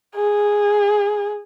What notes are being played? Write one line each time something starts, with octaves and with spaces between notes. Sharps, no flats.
G#4